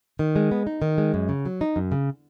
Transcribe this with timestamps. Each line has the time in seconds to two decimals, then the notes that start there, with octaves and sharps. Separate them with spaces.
0.19 D#3
0.36 G#3
0.51 B3
0.67 D#4
0.82 D#3
0.98 G#3
1.14 F#2
1.29 C#3
1.45 F#3
1.61 D#4
1.76 F#2
1.92 C#3